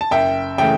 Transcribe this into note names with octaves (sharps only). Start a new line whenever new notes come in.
A5
F#1 E5 G5
C#3 E3 A3 E5 G5